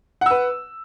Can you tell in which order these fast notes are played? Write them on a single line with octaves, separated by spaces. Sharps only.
F#5 E6 B4